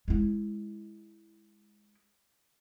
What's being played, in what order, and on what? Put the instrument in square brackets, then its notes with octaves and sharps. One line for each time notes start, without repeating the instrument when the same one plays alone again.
[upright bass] G#3 E4